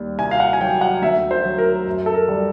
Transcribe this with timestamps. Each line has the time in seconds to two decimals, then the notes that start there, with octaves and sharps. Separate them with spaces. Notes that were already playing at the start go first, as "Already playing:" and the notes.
Already playing: D#2 G3
0.18 C2 G#5
0.31 F5
0.40 F#5
0.53 G#5
0.61 F#3 G5
0.81 F#5
1.02 D2 E5
1.31 C5
1.45 F#3
1.58 A#4
1.87 F#2
2.06 A4
2.14 A#4
2.29 G3